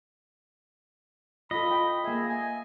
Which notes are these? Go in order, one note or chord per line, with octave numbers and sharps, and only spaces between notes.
F4 A4 D#5 B5
F4 G5
A#3 G#4 E5
G#5